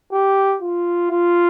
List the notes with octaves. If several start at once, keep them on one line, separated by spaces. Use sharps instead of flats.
G4
F4
F4